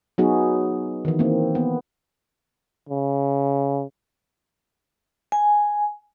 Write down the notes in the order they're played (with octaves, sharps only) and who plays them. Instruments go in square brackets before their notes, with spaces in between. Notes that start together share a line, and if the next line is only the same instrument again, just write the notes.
[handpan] F#3 B3 D#4 F#4 G#4
D#3 E3
A#3 C4
B3
[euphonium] C#3
[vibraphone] G#5